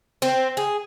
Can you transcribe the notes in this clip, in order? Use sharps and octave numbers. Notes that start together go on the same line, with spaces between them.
C4
G#4